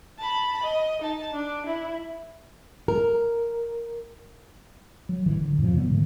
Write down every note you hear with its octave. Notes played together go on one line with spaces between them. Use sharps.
A5 B5
D#5
D#4 A5
D4
E4
A#4
F#3
A1 D#3 E3 F#3
D3
F2 A2 C3 F3
C3 E3 G3 B3
G#2 D3 E3 A3